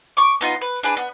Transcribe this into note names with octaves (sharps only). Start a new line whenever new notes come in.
C#6 D6
B3 D#4 F4
B4
D4 G#4 B4
B3